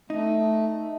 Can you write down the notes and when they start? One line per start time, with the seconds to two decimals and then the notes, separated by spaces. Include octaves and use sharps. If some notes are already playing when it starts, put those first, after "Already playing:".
0.10 A3 D#4